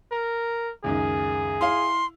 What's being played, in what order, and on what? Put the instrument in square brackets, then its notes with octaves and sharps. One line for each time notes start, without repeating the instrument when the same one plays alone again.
[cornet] A#4
[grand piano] C#2 F#2 D#3 [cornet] G#4
[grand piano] E4 F5 [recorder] C6